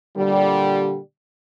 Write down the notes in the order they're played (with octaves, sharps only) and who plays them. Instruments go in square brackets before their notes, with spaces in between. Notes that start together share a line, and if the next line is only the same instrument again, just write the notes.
[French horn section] A#2 D3 G3